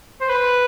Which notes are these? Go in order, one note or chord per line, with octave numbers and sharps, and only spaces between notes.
C5
B4